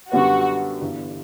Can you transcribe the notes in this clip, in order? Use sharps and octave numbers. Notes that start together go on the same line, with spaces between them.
F#2 D3 G3 B3 F#4
G1 G2 E3